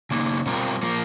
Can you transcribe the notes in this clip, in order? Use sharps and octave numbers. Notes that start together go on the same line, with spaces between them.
C#3 F#3 A#3 D#4
B2 G3 C4 F4 A#4
F3 A#3